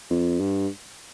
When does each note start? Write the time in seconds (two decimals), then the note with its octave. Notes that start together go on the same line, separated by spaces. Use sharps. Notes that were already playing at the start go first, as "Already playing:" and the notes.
0.10 F2
0.40 G2